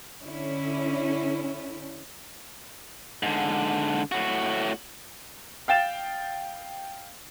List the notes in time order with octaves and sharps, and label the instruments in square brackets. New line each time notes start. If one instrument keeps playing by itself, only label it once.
[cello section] D3 C#4 E4
[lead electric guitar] G#2 D3
A2 F#4
[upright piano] F5 G5 A6 E7